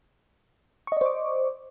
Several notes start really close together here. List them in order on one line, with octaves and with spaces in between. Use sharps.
C#6 D#5 D5 C5 D6